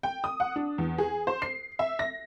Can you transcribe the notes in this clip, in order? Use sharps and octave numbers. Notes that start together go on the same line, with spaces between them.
G5
D#6
F#5
D4
E2
G#4
C5
C7
E5
A#6